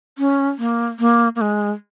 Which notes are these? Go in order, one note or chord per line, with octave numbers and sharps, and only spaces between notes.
C#4
A#3
A#3
A#3
G#3